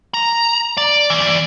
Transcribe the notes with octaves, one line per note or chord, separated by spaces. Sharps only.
A#5
D5
E3 D5